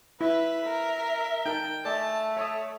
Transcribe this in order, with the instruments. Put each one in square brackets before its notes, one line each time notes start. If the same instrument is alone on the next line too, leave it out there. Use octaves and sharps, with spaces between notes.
[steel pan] E4 E6 [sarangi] B4 [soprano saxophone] E5
[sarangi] A#4
[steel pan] D#4 A#4 A5 [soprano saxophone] G5
[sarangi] A3 [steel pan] D5 D#5 G#5 [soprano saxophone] A5
[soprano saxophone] C#5 [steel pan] E5 A5 D#6